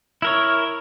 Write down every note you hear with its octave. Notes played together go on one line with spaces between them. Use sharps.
E4 A#4 C#5